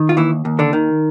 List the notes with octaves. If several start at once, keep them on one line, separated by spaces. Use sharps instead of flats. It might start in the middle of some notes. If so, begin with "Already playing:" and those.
Already playing: D#3
F4
D#2 E3 E4
D#2
D3 D4
D#3